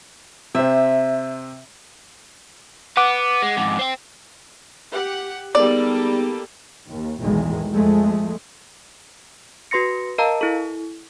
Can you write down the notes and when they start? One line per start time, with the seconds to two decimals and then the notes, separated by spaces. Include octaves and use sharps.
0.55 C3 C4 E5
2.97 B3 F#5 D6
3.42 G#3
3.57 F2 G#2
3.79 C5 G5
4.93 G4 F#5
5.55 G3 A#3 B3 D#4 G#4 A4 D5
6.88 D#2
7.20 B1 E2 A2 D#3 G#3
7.72 F2 G#3 A3
9.71 F#4 B4 C6 A#6 C#7
10.18 A#4 D#5 F5 A5 A#5 E6
10.41 E4 A4